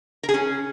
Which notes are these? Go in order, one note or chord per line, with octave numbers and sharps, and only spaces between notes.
A#4
G#4
C#4